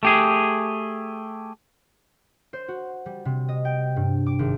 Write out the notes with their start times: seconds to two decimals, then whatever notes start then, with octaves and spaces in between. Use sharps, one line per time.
0.03 A3 G4 G#4
2.53 C5
2.68 F#4
3.06 G3
3.25 C3
3.49 D#5
3.65 G5
3.96 G2
4.26 D6
4.39 G#1